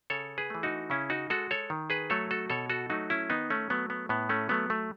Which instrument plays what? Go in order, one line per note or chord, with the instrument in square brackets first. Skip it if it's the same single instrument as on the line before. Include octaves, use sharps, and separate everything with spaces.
[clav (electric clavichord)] C#3 A4 C#5
G#4 B4
E3 A3
D#4 F#4
C#3 C#4 E4
D#4 F#4
G#3 F#4 A4
A4 C#5
D#3
G#4 B4
F#3 A3 A4 C#5
F#4 A4
B2 A4 C#5
F#4 A4
F#3 A3 D#4 F#4
C#4 E4
D#3 B3 D#4
A3 C#4
F#3 A3 B3
B3
A2 B3
A3 C#4
F#3 A3 B3
A3